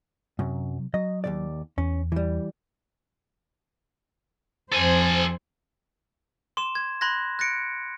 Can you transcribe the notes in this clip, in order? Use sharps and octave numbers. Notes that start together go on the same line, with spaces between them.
F#2 C3 F#3
F#3 D#5
D#2 A#2 D5
E2 C#4
E3 G3
F2 A4 C5 G#5
C6 D6 E7
G#6
B5 C6 F#6 G#6 A#6
F#6 A6 A#6 C#7 D7